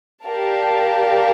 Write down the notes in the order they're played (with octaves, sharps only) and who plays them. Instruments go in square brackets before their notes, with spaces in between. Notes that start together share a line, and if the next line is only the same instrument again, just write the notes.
[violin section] G4 A#4 D5 F5 A5